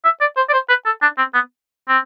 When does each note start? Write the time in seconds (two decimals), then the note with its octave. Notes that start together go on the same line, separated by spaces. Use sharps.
0.05 E5
0.21 D5
0.37 C5
0.49 D5
0.53 C5
0.69 B4
0.86 A4
1.02 D4
1.18 C4
1.34 B3
1.89 C4